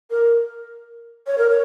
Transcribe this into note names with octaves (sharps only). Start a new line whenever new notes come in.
A#4
C#5
A#4
C#5